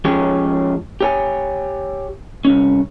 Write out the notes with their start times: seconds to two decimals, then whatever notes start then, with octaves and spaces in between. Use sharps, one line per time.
0.05 F3 G#3 C#4 G4 G#4 C#5
1.01 G4 C#5 G#5
2.45 C2 C#4